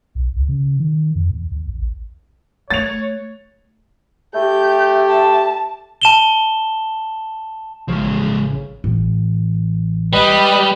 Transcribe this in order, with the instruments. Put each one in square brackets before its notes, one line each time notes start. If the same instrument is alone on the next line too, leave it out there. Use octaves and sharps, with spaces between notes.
[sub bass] B1
C#2
C#3
D#3
F2
E2
D#2
A1
[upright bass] A3 [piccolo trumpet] C#5 [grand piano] A6 F7
[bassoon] A3 [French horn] G4 [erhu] G6
[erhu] A5
[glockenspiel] A5 E7 G7
[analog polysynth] A1 C#3 [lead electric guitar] F3 G#3
[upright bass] A1
[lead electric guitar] G3 [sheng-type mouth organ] B4 D#5 B5